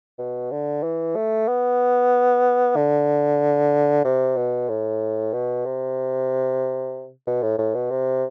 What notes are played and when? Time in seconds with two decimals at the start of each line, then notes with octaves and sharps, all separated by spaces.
0.19 B2
0.52 D3
0.83 E3
1.16 A3
1.48 B3
2.76 D3
4.05 C3
4.37 B2
4.69 A2
5.33 B2
5.65 C3
7.27 B2
7.43 A2
7.58 A2
7.74 B2
7.91 C3